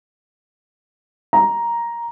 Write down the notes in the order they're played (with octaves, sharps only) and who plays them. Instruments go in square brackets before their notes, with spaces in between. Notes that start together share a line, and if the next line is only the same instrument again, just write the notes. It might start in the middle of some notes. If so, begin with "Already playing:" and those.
[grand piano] A#5